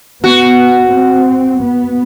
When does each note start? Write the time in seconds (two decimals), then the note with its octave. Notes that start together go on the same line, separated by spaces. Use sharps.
0.24 B3 F#4
0.93 C4
1.62 B3